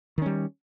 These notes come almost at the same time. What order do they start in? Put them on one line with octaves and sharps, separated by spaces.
D#3 C#4 G3